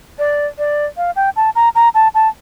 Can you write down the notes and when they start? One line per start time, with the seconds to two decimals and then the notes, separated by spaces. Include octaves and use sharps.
0.19 D5
0.58 D5
0.97 F5
1.16 G5
1.36 A5
1.55 A#5
1.75 A#5
1.95 A5
2.15 A5